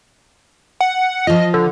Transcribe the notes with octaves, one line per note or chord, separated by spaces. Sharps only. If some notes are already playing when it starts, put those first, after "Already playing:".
F#5
F3 F4 D#5
D3